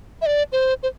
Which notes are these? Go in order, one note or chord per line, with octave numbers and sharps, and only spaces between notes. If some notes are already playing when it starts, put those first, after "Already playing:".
E5
D5
C5
C5